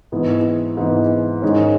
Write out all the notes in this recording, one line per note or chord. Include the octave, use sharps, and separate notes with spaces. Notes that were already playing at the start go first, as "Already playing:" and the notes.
G#2 E3 B3
G#2 E3 B3
G#2 D#3 G#3 C#4